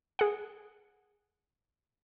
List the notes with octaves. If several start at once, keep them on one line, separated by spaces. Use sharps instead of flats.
G#4 F#5